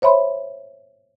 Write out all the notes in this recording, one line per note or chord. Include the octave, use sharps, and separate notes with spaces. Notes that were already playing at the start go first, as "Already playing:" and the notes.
C5 C#5 E5 B5 C6